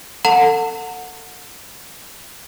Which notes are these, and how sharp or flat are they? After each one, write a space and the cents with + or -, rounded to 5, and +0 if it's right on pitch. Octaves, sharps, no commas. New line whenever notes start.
A4 +30 F#5 -20 A5 +45